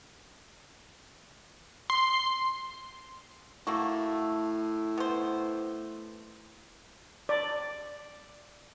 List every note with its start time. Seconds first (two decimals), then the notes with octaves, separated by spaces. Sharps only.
1.90 C6
3.67 A2 A3 A#3 F#4
4.98 B3 C5
7.29 D5